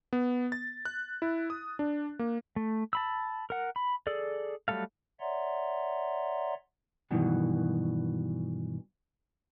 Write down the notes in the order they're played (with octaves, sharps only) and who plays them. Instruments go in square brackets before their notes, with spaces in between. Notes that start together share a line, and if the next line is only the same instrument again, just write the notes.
[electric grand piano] B3
A6
F#6
E4
D#6
D4
A#3
[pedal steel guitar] A3
A5 B5 E6
A#4 F#5
B5
G#4 A4 D5
F#3 G3 A3 A4 F5
[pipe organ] C#5 D5 E5 F#5 A#5 C6
[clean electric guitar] G2 B2 D#3 E3 F#3